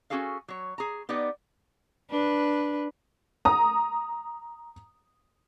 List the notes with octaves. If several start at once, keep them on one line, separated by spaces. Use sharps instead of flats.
C#4 F4 F#4 G#4 A4 F5
F#3 C#5
G#4 A#5
B3 D#4 G4 D5 F#5
D4 B4
A#5 D#6